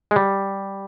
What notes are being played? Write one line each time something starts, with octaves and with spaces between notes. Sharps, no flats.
G#3
G3